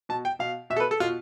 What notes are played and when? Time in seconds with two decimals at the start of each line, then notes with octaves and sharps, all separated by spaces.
0.09 B2 A5
0.25 G5
0.39 B2 F5
0.70 B2 E5
0.76 A4
0.80 B4
0.91 A4
1.00 B2 F4